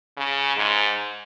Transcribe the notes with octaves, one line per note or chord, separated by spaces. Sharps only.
C#3
G#2